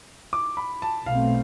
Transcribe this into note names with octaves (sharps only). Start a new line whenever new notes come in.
D6
B5
A5
B1 B2 A3 C4 F5